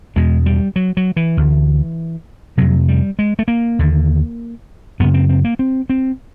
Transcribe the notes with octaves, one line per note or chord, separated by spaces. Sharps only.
E2 B2 G#3
G3
F#3
F#3
E3
D2 D3
F2 C3 F#3
G3
G#3
A3
A#3
D#2 D3
F#2 C#3 B3
C4
C4
A#3
C4
C4